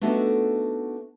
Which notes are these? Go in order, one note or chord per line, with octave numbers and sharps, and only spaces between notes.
A3 B3 D4 D#4 F#4 A4